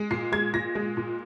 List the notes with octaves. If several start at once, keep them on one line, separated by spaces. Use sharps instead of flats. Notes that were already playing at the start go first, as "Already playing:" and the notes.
Already playing: G#3
A#2 C7
G#3 G#6
A#2 A#6
G#3
A#2